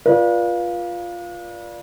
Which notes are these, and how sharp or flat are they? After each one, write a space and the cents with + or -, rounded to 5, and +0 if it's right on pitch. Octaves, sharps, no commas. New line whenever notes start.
F4 +0 B4 -40 D5 +5